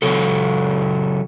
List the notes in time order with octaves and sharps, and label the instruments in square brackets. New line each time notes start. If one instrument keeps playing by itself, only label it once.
[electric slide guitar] C#3 F#3 A4